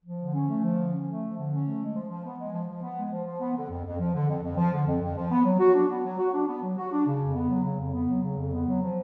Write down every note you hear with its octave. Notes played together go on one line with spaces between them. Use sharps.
F3
D3
C#4
A3
F3
D3
C#4
A3
F3
D3
C#4
A3
G#3
F3
F3
B3
G#3
F3
F3
B3
G#3
F3
F3
B3
D3
F2
F2
F3
D3
F2
F2
F3
D3
F2
F2
F3
B3
F#3
F#4
D4
B3
F#3
F#4
D4
B3
F#3
F#4
D4
C#3
F2
B3
F#3
C#3
F2
B3
F#3
C#3
F2
B3
F#3
F3